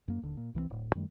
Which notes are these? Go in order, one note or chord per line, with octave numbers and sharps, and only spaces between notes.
F#2 A#3
D#1 D3
A#2
C2 E3 F#3 C4
D1 A2
F#2 D#3 G3 A3